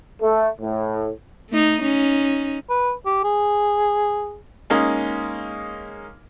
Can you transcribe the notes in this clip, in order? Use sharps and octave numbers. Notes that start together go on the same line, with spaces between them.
A3
A2
A3 D#4
C#4 D#4
B4
G4
G#4
G#3 A#3 C#4 D#4